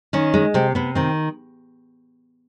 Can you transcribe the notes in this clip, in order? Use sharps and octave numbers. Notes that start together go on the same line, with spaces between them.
D#3 C#4
G#3
C3 C4
C3 B3
D#3 C4